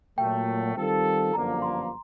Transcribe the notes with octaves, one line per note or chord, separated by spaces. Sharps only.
A#2 F#3 A3 G5
D#3 G3 C4 F4 A4
G1 F#2 D3 F3 A#3 A#5
C6